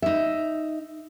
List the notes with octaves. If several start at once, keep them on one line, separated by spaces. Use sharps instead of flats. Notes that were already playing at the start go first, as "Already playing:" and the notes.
D#4 E5